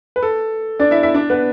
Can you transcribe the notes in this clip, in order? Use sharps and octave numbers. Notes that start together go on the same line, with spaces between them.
B4
A4
D4 D5
E4 E5
E4 E5
D4 D5
B3 B4